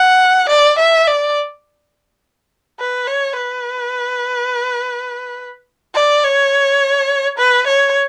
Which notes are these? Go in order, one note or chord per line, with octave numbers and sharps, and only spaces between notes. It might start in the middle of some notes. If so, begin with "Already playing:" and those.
Already playing: F#5
D5
E5
D5
B4
C#5
B4
D5
C#5
B4
C#5